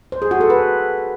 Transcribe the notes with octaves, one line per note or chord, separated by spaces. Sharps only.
C5
G#4
F#4
A4
B4